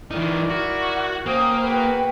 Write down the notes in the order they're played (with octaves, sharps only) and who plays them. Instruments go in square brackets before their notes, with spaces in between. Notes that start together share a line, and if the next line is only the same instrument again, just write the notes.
[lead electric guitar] E3 D#4 [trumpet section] E4 A#4 D5
[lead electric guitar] F#4
[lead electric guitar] A#3 [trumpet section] C#4 G5 D#6 [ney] C5
[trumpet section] F#4 G#4 B4 [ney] G5